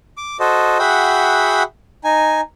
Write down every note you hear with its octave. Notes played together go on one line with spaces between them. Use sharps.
D6
F#4 A4 C5 D#5
F#4 G#4 E5 F#5 G5 B5
D#4 G#5